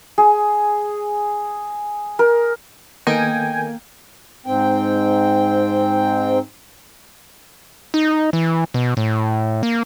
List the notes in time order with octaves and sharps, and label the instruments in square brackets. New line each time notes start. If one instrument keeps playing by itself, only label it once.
[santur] G#4
A#4
[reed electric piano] D#3 B3 A4 [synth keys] A#3 [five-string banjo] D#4 [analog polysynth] G5 G#5
[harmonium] G#2 C4 G5
[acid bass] D#4
E3
B2
A2
A#3